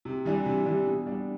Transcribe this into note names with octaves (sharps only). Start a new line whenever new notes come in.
C3
E3 G3 D4
C3
E3 G3 D4
B2
G3 D4